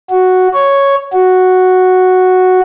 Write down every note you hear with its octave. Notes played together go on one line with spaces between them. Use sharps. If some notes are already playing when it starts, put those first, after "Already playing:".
F#4
C#5
F#4